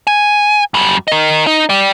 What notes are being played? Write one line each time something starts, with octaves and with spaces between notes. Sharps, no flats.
G#5
F#2 G3
A#4 D#5
D#4
G4 D5